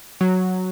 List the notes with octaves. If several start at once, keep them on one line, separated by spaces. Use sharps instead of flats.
F#3